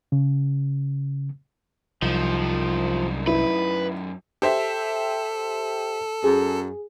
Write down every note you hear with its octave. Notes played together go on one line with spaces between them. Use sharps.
C#3
C2 F#2 F3 D#4
E4 B4
G4 A4 C5 E5
F#2 G#4